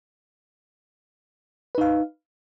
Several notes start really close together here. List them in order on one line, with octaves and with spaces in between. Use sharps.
B4 D#4 F5